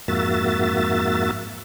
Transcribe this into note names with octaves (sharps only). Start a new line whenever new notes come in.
F2 G#2 A#3 F#4 E5 A6